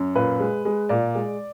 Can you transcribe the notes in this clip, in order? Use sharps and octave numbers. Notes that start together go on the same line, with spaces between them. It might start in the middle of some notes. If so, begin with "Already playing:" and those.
Already playing: F#2
A#2 B4
G#3
G#3
A#2 D5
G#3